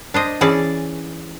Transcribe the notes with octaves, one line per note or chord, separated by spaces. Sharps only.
D4 C5 D#5
E3 C#4 G#4 D5 A5